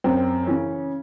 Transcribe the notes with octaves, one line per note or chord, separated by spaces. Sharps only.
F#2 C4
C#3 E3 C#4